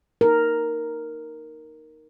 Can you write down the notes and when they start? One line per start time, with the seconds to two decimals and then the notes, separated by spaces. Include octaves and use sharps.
0.21 D#4 A#4